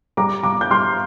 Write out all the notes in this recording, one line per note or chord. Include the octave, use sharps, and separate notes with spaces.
G3 A#5 D6
G3 A#5 D6
G6
G3 C6 F6